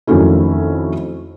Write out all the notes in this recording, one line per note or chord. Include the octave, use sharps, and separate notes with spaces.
F2 D#3 F#3 A3 C#4 E4